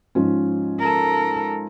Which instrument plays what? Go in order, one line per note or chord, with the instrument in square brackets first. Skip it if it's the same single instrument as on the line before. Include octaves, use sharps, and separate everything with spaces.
[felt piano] G#2 F3 C#4
[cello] A4 A#4